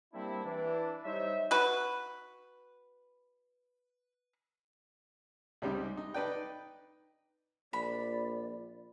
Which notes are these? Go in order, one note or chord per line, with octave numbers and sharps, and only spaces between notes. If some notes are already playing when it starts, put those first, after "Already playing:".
G3 A#3 C4 D4 E4
E3 D4
G3 D#4 C5 C#5 E5
F#4 B4
C#2 G3 C4 D#4
D#4
D#4 B4 D5 G5
A#1 D5 B5